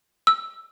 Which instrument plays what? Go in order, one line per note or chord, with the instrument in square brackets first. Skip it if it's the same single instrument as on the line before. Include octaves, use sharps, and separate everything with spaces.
[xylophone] E6